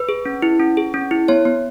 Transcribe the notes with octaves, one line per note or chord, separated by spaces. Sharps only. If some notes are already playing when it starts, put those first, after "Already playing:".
Already playing: B4
G#4
C#4
E4
C#4
G#4
C#4
E4
B3 C#5
B3